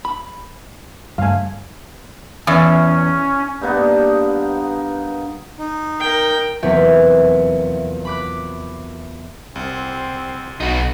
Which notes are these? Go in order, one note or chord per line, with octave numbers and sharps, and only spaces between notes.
B5
C#2 G2 A3 F5 G#5
E2 C#4
G2 A#3 B3 D#4
D#4
A#4 G5
F1 E2 F#3 A#3 C4 E5
B5 D6 F#6
C2 C4
B1 D#4 F#4